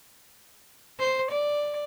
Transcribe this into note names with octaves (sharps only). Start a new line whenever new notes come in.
C5
D5